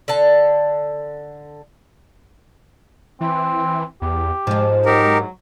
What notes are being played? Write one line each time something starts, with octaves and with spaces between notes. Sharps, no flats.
D3 A4 A5
E3 C4
E2 G4
G#2 F3 G#3
F#3 D#4 G4 A#4